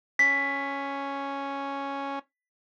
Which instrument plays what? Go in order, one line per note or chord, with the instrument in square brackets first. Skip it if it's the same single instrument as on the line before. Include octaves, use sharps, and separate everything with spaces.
[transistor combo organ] C#4 [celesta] B6